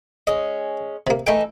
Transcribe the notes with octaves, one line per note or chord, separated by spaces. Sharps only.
G#3 C#4 D#5
C3 A#3
E3 A3 D#4 A4 G5